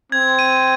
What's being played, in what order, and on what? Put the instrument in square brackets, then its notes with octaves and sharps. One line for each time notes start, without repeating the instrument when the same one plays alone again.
[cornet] C4 [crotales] G#6
[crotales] D#7